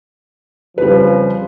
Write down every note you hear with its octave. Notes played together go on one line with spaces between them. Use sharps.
F2 C#3 F3 G3 B4